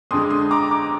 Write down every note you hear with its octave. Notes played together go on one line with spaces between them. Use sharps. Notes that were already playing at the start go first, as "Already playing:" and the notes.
F2 D3 G#3 C6 D#6
C6 D#6
A#5 D6
A#5 D6